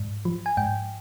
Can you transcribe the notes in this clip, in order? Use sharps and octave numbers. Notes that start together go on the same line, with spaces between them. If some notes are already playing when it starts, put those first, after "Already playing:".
Already playing: G#2
F3
G#5
G#2 G5